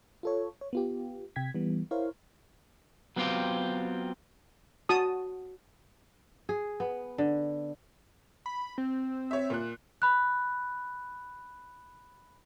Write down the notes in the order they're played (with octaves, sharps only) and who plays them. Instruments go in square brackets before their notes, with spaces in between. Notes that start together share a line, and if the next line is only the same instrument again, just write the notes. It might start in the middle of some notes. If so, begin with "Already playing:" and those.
[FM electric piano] F4 A4 C#5
C#5
B3 F4 G4
C3 G5 G#6 B6
E3 G3 B3
E4 A#4 C5 C#5 F5
[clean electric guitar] F#3 B3 C4 F4 G4
[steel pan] F#4 A5 D#6
[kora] G#4
B3
D3
[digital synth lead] B5
C4
[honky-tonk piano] C#5 E5
A#2 F#6
[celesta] B5 F#6